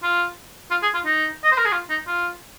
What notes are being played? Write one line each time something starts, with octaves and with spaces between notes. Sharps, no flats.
F4
F4
G#4
F4
D#4
D#5
C5
A#4
G#4
F4
D#4
F4